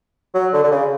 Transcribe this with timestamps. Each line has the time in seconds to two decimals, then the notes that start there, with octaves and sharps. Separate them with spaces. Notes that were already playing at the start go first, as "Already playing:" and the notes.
0.34 F#3
0.53 D3
0.63 D3
0.71 C#3